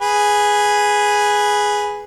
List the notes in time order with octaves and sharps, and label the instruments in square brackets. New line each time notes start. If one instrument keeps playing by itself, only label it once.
[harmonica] G#4 B4 G#5